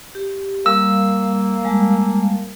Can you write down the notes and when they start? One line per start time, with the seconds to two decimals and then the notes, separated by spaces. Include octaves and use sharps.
0.15 G4
0.66 G3 A#3 E6
1.65 G3 G#3 A5